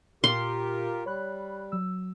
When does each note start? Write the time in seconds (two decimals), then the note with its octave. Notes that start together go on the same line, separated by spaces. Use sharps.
0.24 A#2 F4 G4 A#4 C6
1.06 G3 C#5 B5 F#6
1.72 F#3 E6